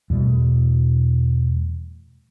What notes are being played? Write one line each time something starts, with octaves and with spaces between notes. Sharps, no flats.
E2 B2 G3 A3